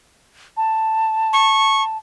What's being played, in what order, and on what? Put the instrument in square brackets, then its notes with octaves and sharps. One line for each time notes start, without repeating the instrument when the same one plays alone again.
[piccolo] A5
[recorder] C#6